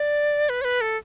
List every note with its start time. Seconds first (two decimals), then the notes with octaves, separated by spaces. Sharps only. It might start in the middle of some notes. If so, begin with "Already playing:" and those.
Already playing: D5
0.49 B4
0.61 C#5
0.64 B4
0.81 A4